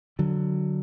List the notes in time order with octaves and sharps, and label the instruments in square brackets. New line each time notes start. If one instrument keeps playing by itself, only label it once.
[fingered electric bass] D3 F#3